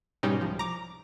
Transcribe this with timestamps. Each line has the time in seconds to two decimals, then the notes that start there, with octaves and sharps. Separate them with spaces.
0.23 G#2 B2 G3 C#4 D#4 G4
0.41 C2 F3
0.59 A#5 D6